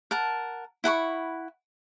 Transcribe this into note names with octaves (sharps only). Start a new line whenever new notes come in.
A#4 F#5 A5
E4 F#5 B5 C#6